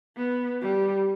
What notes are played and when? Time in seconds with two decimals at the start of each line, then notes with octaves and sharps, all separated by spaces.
0.17 B3
0.62 G3